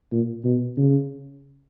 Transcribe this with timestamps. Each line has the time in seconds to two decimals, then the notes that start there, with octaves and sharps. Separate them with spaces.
0.12 A#2
0.44 B2
0.77 C#3